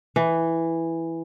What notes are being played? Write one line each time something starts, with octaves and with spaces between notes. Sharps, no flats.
E3